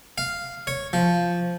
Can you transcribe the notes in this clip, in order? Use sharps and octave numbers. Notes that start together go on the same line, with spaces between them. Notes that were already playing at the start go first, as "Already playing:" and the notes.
F5
C#5
F3